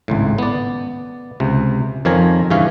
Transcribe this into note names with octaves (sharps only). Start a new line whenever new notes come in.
G#1 C#2 A2
B3 D5
C#2 C3
F2 D#3 F3 A#4 C#5 G#5
G2 C#3 E3 C#4 C#5 F5